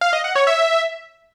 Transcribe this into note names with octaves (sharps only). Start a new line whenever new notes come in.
F5
D#5
F#5
C#5
E5